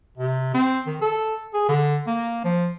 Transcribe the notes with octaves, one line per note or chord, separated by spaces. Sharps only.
C3
C4
D#3
A4
G#4
D3
A#3
F3